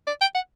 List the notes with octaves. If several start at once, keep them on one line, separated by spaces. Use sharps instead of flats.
D5
G5
F#5